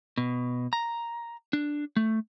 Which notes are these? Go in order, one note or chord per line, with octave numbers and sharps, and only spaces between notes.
B2
A#5
D4
A3